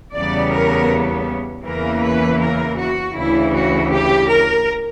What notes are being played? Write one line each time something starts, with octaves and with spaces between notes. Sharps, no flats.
E2 C#3 G3 B3 D5
A#4
E2 C#3 E3 A#3 A#4
B4
A#4
F#4
D2 C#3 E3 E4
F#4
G4
A#4